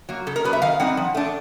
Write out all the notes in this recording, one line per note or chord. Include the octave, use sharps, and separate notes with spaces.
F#3 A#3
C#3 A4
A#4
F#3 B3 D4 B4
E5
D#3 F5
G3 C4 D#4 F#5
F3
A3 D4